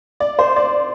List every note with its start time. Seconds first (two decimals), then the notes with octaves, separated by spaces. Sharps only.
0.20 D5
0.39 C5
0.56 D5